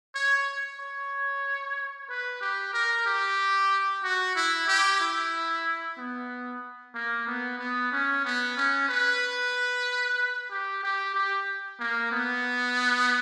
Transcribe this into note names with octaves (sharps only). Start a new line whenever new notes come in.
C#5
C#5
B4
G4
A#4
G4
F#4
E4
G4
E4
B3
A#3
B3
B3
C#4
B3
C#4
B4
G4
G4
G4
A#3
B3